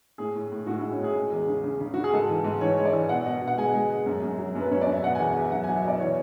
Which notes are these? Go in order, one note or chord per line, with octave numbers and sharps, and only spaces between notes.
A2 G#4
A2
A2
A2 F#4
E4
G#3
C#4
A2
G#4
G#3
E2
C#3
C#3
C#3
C#3 F#4
G#4
G#2 A4
E3
G#2
E3 C#5
G#3 C#5
D5
E3
B2 F#5
B2
B2
F#5
G#3 G#5
G#3
G#3
F#2
F#2
F#3
F#2
B4
F#2 C#5
D5
F#2
E5
B2 F#5
G#5
E2
F#5
E2 E5
F#3 F#5
G#5
F#3
E5
B2 D5
E3 C#5